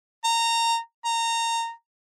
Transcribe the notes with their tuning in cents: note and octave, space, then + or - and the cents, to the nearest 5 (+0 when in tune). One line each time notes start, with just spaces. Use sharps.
A#5 -20
A#5 -20